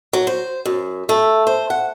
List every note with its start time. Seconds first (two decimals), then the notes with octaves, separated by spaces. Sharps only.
0.13 F#3
0.27 C5
0.65 F#2
1.09 A3
1.47 C5
1.70 F#5